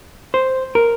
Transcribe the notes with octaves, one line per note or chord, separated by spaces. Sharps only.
C5
A#4